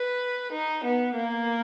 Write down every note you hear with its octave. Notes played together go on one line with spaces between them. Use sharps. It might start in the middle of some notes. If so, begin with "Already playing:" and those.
Already playing: B4
D#4
B3
A#3